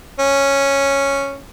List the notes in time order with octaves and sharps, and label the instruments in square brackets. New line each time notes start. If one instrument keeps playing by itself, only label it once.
[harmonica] C#4